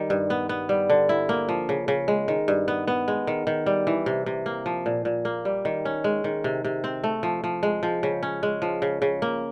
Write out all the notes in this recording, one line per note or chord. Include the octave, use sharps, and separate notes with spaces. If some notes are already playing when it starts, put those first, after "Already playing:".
Already playing: D#3 G3
G2
B3
B3
G3
D3
E4
A#3
F3
C#3
C#3
G#3
D#3
G2
B3
B3
G#3
D#3
D#3
G3
E3
C3
C3
A#3
F3
A#2
A#2
A#3
G3
D#3
C#4
G#3
D#3
C3
C3
C4
A3
F3
F3
G#3
F3
C#3
C#4
G#3
F3
C#3
C#3
A#3